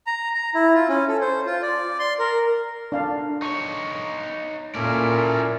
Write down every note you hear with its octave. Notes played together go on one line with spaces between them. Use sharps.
A#5
A#5
E4
F4
C#4
A4
C5
F4
D5
C6
A#4
D4 F5 A5
D#4 C#5 C#6
A#2 C#4 E4 A4 A#4 D5